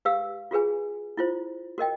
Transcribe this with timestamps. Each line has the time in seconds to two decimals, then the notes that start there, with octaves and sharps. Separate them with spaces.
0.05 G4 B4 F5 E6
0.51 F4 F#4 G#4 B4 G#5
1.17 E4 F4 C5
1.78 F#4 A#4 D#5 G5